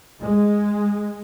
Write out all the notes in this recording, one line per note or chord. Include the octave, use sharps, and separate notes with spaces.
G#3